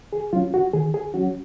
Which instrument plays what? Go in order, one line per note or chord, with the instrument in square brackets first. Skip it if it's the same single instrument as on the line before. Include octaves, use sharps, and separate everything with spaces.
[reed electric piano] G#4
F#3 C#4 F4
F#4
D#3 G#4
G#4
F#3 C#4 F#4